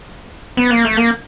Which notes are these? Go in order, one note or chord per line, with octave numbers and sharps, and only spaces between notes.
B3
A#3
A3
A#3